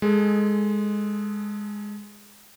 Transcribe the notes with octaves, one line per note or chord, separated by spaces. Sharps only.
G#3 G#4 A4